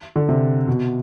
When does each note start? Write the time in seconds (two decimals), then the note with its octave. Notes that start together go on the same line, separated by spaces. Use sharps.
0.16 D3
0.29 C3
0.67 B2